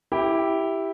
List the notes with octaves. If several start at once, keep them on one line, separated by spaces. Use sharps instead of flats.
E4 G4